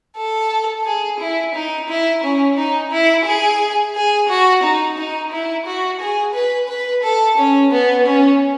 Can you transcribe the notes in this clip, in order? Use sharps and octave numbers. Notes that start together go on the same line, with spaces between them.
A4
G#4
E4
D#4
E4
C#4
D#4
E4
G#4
G#4
F#4
D#4
D#4
E4
F#4
G#4
B4
B4
A4
C#4
B3
C#4